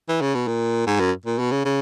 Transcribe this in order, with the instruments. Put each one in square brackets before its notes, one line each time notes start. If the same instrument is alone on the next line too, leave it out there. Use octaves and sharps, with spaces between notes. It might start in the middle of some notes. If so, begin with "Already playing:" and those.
[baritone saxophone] E3
C#3
B2
A#2
G#2
F#2
A#2
B2
C#3
C#3